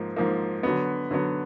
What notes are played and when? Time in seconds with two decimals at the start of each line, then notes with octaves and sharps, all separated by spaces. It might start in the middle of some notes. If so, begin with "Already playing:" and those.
Already playing: G#2 F3 A#3
0.16 G#2 F3 A#3
0.63 D3 F#3 B3
1.11 D3 F#3 B3